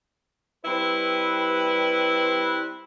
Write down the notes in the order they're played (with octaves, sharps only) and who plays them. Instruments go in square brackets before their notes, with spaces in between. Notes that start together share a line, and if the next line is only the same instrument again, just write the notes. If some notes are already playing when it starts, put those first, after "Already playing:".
[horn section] G3 C4 E4 B4